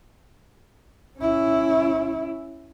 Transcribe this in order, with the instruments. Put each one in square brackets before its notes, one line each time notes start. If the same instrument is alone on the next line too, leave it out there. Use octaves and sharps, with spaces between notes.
[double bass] C#4 E4